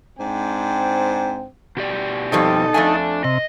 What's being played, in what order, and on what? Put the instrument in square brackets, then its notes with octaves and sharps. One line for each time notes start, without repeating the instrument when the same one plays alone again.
[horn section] G#2 C4 D4 G5
[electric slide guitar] B2 G4 D5
[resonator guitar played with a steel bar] F2 G3 C4 [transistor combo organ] D#4 A4
[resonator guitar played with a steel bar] F2 A3 G#5 [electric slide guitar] D4
[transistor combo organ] C3 [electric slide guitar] D#5